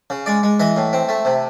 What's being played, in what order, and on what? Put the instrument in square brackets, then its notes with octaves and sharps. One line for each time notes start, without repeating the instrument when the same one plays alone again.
[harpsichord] C#3
G#3 D5
G#3
E3 D#5
A2
C4
A3
C3